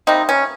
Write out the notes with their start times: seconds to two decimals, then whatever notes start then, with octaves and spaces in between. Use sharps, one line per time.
0.07 C3 G3 A#3 C4 D#4
0.29 C#4